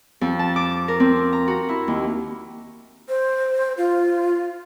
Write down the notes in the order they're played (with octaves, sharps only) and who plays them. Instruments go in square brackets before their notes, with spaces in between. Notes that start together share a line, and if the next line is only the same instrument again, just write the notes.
[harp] F2
A5
D6
A#4
C4
A#5
F#4
E4
D#2
[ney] C5
F4